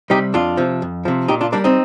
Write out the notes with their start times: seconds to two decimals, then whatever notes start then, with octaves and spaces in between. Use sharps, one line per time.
0.10 C3 G3 D#4 G4
0.34 F2 D4 F4
0.57 C3 F3
0.82 F2
1.05 C3 F3
1.28 A#2 D#4 G4
1.41 D4 F4
1.52 G3 A#3 D4
1.64 C4 D#4